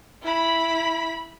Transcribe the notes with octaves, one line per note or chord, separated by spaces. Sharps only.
E4 B5